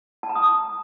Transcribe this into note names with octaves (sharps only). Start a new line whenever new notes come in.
A5
A#5
D#6